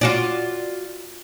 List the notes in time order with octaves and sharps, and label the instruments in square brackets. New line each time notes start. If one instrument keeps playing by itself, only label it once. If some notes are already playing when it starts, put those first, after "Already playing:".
[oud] F4 F#4 D5